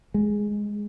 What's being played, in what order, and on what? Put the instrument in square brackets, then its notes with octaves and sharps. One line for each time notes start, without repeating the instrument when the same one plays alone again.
[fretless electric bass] G#3